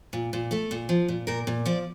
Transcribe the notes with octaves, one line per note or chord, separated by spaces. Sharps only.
A#2
A#2
A3 A4
A#2
F3
A#2
A#2 A#4
A#2
F3 D5